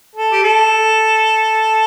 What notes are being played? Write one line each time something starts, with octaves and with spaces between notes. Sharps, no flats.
A4
G4
A4